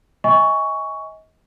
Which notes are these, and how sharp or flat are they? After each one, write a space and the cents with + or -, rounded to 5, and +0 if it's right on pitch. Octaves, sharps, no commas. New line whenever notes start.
D#5 +35 G#5 -10 C#6 +10